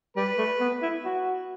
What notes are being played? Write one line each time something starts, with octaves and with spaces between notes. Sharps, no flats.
G3 B4
A3
B3
E4
F#4